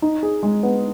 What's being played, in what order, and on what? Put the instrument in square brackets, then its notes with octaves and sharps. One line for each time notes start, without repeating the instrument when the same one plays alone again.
[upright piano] D#4
G#4
G#3
B3